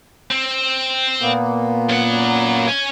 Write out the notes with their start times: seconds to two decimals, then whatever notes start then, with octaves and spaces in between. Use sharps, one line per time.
0.30 C4
1.22 A#2 A#3 B3
1.89 F#2 F#5
2.68 C#5 G#5